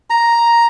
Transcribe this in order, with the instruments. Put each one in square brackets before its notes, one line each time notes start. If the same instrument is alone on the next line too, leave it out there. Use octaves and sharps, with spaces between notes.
[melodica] A#5